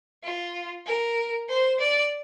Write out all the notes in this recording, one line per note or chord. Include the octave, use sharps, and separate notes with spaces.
F4
A#4
C5
D5